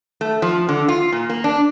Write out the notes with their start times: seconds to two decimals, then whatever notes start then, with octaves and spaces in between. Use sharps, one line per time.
0.21 A3
0.42 F3
0.69 D3
0.88 F4
1.12 A#2
1.29 A#3
1.44 D4